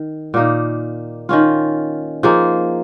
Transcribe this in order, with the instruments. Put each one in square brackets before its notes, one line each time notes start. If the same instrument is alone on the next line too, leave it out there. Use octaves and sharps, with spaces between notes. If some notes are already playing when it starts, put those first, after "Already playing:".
Already playing: [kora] D#3
A#2 A#3 D#4
D#3 C#4 F4
F3 A#3 D#4 G#4